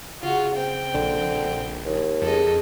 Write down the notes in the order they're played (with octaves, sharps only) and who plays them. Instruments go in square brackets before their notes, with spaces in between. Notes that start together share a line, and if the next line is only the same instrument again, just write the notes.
[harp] C#3 [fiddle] F4 F#4
[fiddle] C4 G5
[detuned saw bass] A#1 [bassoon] D3
[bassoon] D#2
[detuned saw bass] F2 [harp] G#4 [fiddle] A4 D#5